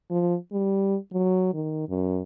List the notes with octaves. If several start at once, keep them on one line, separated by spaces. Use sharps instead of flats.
F3
G3
F#3
D#3
F#2